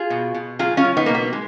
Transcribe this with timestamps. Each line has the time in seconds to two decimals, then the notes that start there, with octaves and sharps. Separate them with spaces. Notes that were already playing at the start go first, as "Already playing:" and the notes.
Already playing: F4 G#4
0.10 B2
0.34 B2
0.59 F#3 F4 G#4
0.77 C#4 F4
0.84 F#3
0.97 B3 D#4
1.06 B2 A#3
1.15 B3
1.33 G#3